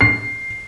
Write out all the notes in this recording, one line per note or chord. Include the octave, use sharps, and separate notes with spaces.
C7